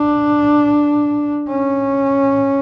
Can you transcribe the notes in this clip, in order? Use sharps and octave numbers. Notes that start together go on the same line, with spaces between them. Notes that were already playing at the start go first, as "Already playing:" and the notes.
Already playing: D4
C#4